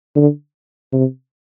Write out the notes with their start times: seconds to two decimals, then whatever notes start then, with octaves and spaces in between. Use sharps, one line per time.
0.16 D3
0.93 C3